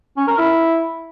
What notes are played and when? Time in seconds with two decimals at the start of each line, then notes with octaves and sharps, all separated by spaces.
0.17 C#4
0.27 A#4
0.38 E4